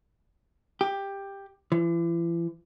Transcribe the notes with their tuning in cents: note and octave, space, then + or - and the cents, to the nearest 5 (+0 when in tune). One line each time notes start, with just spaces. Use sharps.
G4 +10
E3 +40